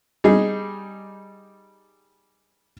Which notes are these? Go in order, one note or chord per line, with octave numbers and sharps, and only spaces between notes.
G3 D#4 G#4